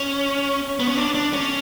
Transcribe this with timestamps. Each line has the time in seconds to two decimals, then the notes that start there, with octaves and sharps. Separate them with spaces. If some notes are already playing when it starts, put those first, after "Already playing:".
Already playing: C#4
0.80 B3
0.88 C#4
0.97 D4
1.15 D4
1.33 C#4